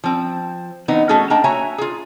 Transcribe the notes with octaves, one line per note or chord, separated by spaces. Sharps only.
F3 C4
E3 B3 C4 D#4
A3 C#4 F#4 G#4 A4
A#3 D4 D#5 G5 A5
F#4 C#5 E5 G#5 A#5
F4 G#4